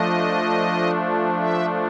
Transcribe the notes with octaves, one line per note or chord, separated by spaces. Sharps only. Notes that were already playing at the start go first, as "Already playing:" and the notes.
Already playing: F3 A3 D4 D#5
E5